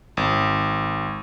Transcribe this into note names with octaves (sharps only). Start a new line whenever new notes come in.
G#1